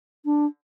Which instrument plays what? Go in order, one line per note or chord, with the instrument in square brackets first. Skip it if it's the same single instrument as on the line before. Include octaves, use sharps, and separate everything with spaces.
[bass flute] D4